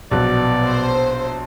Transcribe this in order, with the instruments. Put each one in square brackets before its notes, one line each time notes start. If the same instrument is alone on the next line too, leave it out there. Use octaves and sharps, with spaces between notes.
[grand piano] A#1 F#3 F#6 [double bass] B2 [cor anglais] D5
[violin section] C5